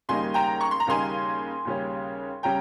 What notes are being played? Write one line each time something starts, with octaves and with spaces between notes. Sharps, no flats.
D#2 C#3 G3 A#3 D#4 G#5 C6
G5 A#5
C#6
C6
A#5
D#2 C#3 G3 A#3 D#4 G#5 C6
D#2 C#3 G3 C#4
C#3 G3 C#4 G5 A#5